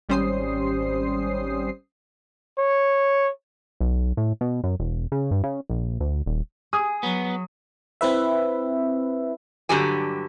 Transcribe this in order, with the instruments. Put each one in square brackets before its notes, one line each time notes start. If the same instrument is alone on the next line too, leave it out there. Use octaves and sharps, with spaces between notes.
[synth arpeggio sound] G#1 G3 C#4 C5 D#6 C7
[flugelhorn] C#5
[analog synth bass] B1
A2
B2
F#2
E1
C#3
G2
C#3
A#1
D2
D#1
[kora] G#4 [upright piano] D#6
[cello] F#3 [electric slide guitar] B3
[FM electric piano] C4 E4 B4 E5
[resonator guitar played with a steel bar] G2 D3 F#3 F#4 G4 G#5